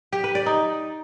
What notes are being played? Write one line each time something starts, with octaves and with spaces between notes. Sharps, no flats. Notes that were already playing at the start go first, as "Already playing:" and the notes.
G4
B4
D5
D#4